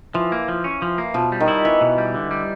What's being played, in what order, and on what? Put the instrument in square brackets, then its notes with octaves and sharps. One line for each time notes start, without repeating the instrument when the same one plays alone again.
[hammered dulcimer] E3 [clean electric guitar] F3
[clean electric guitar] A#3
F3
C#4
F3
A#3
[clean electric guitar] B2 [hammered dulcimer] F3
[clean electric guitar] G3
[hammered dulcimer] D#3
[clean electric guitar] E4
[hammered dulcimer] E3 [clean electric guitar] B3
[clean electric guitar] B2
G3
D3
G3